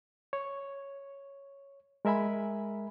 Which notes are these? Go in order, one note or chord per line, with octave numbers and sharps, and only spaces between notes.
C#5
G#3 A#4 E5 G#5 B5